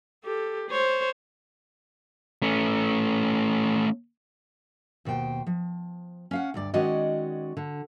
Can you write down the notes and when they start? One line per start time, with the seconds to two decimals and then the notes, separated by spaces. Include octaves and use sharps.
0.25 G4 A4
0.70 C5 C#5
2.42 A3 C#4
5.05 D#2 B2 C5 G5
5.47 F3
6.31 C#4 F5 F#5
6.54 D2 G2 D5
6.74 D#3 G#3 C#4 F#4 D5 D#5
7.57 D3